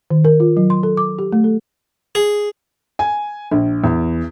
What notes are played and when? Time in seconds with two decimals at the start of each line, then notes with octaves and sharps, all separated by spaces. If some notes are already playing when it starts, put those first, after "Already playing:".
0.11 D#3
0.25 A#4
0.40 F4
0.57 F#3
0.70 C6
0.83 A4
0.97 D6
1.19 G4
1.32 A3
1.44 A4
2.15 G#4
2.99 G#5
3.51 A#1
3.84 E2